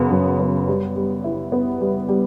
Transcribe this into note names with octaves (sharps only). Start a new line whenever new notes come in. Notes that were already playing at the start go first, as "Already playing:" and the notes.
Already playing: F#2 C#3 B3
F#2
B3
G3
G3
E4
B3
G3
G3